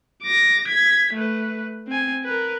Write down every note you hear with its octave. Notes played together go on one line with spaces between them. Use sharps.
D6 A#6
G#6 B6
A3 B4
C4 G#5
A#4 B4